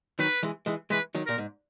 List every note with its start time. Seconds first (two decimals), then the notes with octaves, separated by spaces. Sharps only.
0.19 D#3 F#3 B4
0.43 E3 G#3
0.66 E3 G#3
0.90 E3 G#3 B4
1.15 D#3 F#3
1.26 A#2 A#4
1.38 G#2